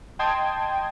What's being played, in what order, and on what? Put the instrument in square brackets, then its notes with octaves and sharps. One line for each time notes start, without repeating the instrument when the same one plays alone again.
[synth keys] D#5 G5 A5 C6 D#6 G#6